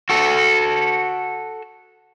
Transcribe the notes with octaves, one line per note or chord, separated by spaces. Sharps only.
F#4 A4